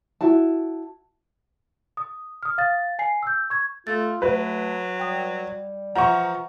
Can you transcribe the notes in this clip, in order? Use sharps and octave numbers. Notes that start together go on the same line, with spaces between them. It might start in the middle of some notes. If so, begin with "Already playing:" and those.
E4 F#4 A5
D#6
D#6 F6
F5 A6
G#5 C7
E6 G6
C#6 G#6
A3 F4 A6
F#3 A3 B4
G3 G5 D#6
E3 F3 E5 F#5 A#5 C#6